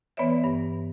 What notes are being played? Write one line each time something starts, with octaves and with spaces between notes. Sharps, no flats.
E3 B3 B4 C#5 D5 E5
G2